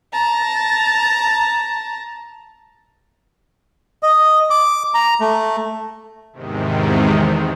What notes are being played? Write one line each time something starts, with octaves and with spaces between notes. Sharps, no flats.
A5 A#5
D#5
D6
A#5
A3
E2 G#2 C3 D#3